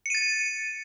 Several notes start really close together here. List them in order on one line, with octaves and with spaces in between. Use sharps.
C#7 D#7 A6